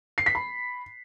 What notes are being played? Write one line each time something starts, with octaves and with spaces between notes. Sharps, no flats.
C7
B6
B5